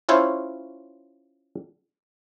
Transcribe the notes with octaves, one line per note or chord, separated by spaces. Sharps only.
C#4 E4 F4 C5 C#5